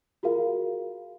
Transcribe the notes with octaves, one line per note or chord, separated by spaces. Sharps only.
F4 F#4 G#4 A#4 F5